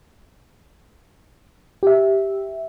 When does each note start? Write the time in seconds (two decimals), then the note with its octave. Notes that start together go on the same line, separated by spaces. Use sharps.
1.83 G4 E5